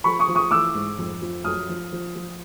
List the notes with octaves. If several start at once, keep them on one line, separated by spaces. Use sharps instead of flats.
F3 B5 C#6
C#6 D#6
F3
C#6 D#6
E3 D6 E6
G#2
F2
F3
F#2 D#6 F6
F3
F3
F3